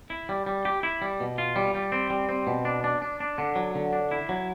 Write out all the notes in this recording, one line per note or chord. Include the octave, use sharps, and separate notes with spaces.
E4
G3
G3
G4
E4
G3
B2
F4
G3
G3
C4
G3
C4
B2
D4
D4
D4
D4
D3
F#3
D3
D4
E4
F#3